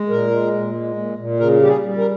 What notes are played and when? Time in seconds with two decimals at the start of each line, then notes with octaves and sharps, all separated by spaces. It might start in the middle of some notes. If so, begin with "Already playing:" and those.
Already playing: G#3
0.09 A#2 A#4
0.31 G#3
0.53 A#2
0.74 G#3
0.96 A#2
1.18 A#2
1.39 C#3 A#4
1.61 G3 G4
1.68 G#4
1.84 G3
1.98 A#4